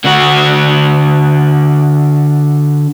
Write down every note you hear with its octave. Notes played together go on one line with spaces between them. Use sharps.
D3 F#4